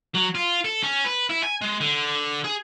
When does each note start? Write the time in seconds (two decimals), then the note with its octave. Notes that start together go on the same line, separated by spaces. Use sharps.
0.15 F#3
0.35 F4
0.65 A4
0.83 C#4
1.06 B4
1.30 E4
1.43 G#5
1.61 G#3
1.81 D3
2.44 G#4